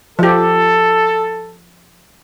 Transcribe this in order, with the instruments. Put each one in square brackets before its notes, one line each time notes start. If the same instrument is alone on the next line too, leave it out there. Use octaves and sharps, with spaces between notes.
[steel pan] F3 G4 [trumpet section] A4